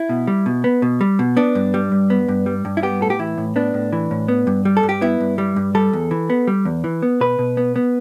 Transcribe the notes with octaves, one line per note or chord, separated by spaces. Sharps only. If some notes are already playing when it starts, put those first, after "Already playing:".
Already playing: E4
B2
G3
B2
B3
B2
G3
B2
B3 D4
G2
G3
G2
B3
G2
G3
G2
E4
B3 G4
A2 A4
G4
E3 E4
A2
B3 D4
A2
E3
A2
B3
G2
G3
A4
G2
G4
B3 E4
G2
G3
G2
G3 A4
E2
E3
B3
G3
E2
E3
B3
B2 B4
B2
B3
B3